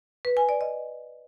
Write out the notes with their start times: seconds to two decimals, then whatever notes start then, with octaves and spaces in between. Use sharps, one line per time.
0.25 B4
0.37 G#5
0.49 D5
0.61 D#5